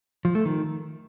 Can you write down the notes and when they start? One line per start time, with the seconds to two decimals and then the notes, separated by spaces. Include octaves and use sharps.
0.25 F3
0.35 A3
0.45 D#3